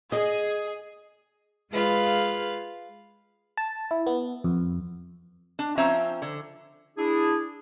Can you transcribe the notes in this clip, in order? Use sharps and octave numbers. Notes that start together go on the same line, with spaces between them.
G#4 D#5
G#3 F4 G#4 B4 F5
A5
E4
B3
F2
D4
F3 C4 C#4 E5 A#5
D3
D4 E4 G#4